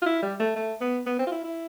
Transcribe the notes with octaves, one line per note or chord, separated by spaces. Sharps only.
F4
E4
G3
A3
A3
B3
B3
C4
F4
E4
E4